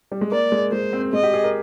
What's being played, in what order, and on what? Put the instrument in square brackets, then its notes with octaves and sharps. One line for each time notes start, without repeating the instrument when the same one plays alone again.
[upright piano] G3
G#3
[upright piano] A#3 [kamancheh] D5
[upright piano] G#3
[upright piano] G#3 [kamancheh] C5
[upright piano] C4
[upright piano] G#3 [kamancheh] D#5
[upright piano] G4
G#4
A#4